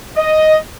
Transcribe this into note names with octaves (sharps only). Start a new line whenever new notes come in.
D#5